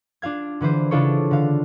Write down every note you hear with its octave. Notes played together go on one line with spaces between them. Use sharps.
D4 F4 F5 G#6
D3 E3 B4 C5
C#3 D4 E4 F4 A4 C#5
D3 F5